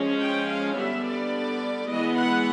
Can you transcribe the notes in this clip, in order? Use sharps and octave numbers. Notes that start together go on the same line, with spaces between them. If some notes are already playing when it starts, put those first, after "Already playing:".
Already playing: F3 G#3 C#4
G5
F5
D3 G3 B3 E5
D5
E3 G#3 B3 D#5
F#5